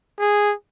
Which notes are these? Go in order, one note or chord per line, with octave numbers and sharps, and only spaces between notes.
G#4